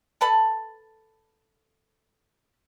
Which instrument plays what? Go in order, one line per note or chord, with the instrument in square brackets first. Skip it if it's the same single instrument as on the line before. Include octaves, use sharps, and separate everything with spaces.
[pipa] A4 B4 A5 B5